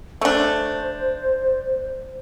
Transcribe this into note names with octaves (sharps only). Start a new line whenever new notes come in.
A3 D4 C5